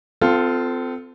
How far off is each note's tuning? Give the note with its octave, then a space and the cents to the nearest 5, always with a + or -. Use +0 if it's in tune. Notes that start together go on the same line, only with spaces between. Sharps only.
C4 -30 F4 +0 A4 +0